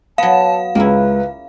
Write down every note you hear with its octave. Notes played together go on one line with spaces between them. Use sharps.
F#3 B3 F5 A5
C#2 A#3 C#4 E4 B4